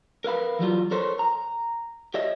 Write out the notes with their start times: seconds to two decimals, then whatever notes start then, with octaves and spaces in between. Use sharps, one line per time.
0.24 A#4 B4 F5 B5
0.59 E3 F#3 G3 F4
0.91 A4 A#4 C5 C#5
1.19 A#5
2.14 G4 C#5 D#5 E5